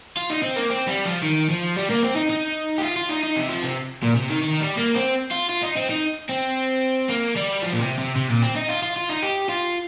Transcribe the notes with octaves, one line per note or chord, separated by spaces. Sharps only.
F4
D#4
C4
A#3
C4
G3
F3
D#3
F3
G3
A#3
C4
D#4
D#4
G4
F4
F4
D#4
D#4
C3
F3
C3
A#2
C3
D#3
D#3
G3
A#3
C4
F4
F4
D#4
C4
D#4
C4
A#3
G3
F3
A#2
C3
C3
C3
A#2
C4
D#4
F4
F4
F4
D#4
G4
F4